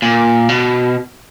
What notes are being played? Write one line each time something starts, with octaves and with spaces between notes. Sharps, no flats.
A#2
B2